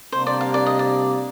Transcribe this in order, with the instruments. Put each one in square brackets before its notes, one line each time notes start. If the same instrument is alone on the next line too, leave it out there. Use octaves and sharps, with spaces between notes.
[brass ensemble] C3 G3 A#3 D4 [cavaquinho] C5
[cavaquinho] D5
F5
D5
D#5
D5